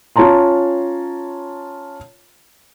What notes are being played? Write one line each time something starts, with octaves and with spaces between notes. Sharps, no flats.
C#4 F4 C#5 A5 A#5 C6